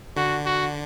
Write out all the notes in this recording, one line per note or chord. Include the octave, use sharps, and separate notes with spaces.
D3 F#4
F#4